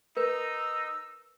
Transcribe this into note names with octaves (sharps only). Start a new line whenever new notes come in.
D#4 A#4 B4 E6